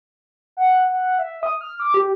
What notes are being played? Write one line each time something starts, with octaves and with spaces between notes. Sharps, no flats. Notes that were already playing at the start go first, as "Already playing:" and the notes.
F#5
F#5
E5
D#6
F6
D6
G4